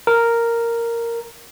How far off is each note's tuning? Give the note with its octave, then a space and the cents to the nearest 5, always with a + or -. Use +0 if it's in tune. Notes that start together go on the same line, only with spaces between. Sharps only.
A#4 -5